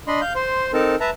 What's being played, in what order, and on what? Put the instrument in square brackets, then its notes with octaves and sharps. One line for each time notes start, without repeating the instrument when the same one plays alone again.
[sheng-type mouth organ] D4 D#5 B5 C6
F5 G6
C5 C6
C4 D#4 A4 A#4 A5
B4 E5 A5 A#5